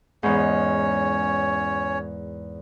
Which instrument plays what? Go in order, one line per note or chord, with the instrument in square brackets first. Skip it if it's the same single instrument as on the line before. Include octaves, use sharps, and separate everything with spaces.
[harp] E2 G#2 [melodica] C#4 C#5